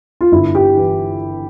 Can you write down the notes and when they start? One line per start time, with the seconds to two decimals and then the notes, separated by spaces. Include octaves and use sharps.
0.21 F4
0.32 G1 E4
0.55 G4
0.76 E3